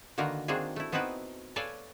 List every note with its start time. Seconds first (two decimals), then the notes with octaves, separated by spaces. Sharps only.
0.18 D3 D#3 A#3 F#4 A#4 B4
0.48 D#3 A#3 C4 D4 F#4 G#4
0.76 A3 E4
0.92 B3 C4 D#4 E4 F#4 B4
1.56 A4 B4 C#5 D5 F5 G#5